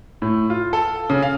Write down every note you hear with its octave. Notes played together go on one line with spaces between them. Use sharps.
A2
F4
A4
C#3
F5